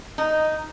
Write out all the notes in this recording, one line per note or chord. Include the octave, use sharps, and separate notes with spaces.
D#4